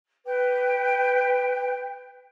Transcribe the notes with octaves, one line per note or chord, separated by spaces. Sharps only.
B4 G5